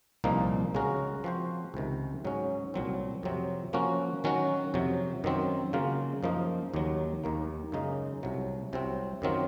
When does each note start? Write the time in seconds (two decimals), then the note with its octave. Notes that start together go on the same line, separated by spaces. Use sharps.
0.24 C2 A#2 F3 A#3 D#4
0.74 C#3 G#3 C#4 F#4 A#4
1.24 F3 C4 F#4 C5
1.74 C#2 C3 D#3
2.25 G#2 F#3 C#4
2.74 C2 A#2 F#3 C4
3.23 F2 C3 F#3 C4
3.73 F3 A#3 C#4 F#4
4.24 D#3 F#3 C#4 F#4
4.74 F2 C3 F#3
5.24 F#2 D#3 F#3 C4
5.73 C#3 F#3 A#3 F4
6.23 F#2 F3 A#3 D#4
6.74 D#2 D#3 F#3
7.24 D#2 D#3 A#3
7.72 F#2 C#3 G#3 D#4
8.23 C2 C3 F#3
8.73 C2 C3 F#3 C4
9.22 F#2 D#3 F#3 C4 F4